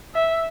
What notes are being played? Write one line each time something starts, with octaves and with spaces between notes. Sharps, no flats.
E5